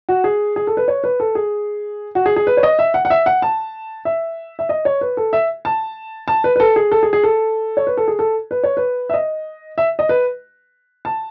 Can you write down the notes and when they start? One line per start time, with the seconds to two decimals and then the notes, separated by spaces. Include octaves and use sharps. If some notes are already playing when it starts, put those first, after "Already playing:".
0.09 F#4
0.24 G#4
0.56 G#4
0.67 A4
0.77 B4
0.88 C#5
1.04 B4
1.20 A4
1.35 G#4
2.15 F#4
2.26 G#4
2.36 G#4
2.47 B4
2.57 C#5
2.63 D#5
2.79 E5
2.94 F#5
3.05 F#5
3.10 E5
3.26 F#5
3.42 A5
4.05 E5
4.59 E5
4.69 D#5
4.85 C#5
5.01 B4
5.17 A4
5.33 E5
5.65 A5
6.28 A5
6.44 B4
6.56 B4
6.60 A4
6.76 G#4
6.92 A4
7.03 G#4
7.13 G#4
7.24 A4
7.77 C#5
7.87 B4
7.97 A4
8.08 G#4
8.19 A4
8.51 B4
8.63 C#5
8.77 B4
9.10 E5
9.14 D#5
9.78 E5
9.99 D#5
10.09 B4
11.05 A5